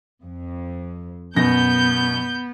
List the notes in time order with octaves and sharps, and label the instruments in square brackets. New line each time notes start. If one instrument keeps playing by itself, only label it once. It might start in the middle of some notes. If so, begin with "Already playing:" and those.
[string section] F2
[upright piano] F#2 B2 A#6 [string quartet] B3 [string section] G6